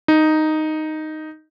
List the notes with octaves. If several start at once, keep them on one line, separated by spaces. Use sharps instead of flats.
D#4